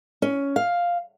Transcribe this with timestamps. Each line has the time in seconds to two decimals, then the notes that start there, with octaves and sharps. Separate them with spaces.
0.22 C#4
0.56 F5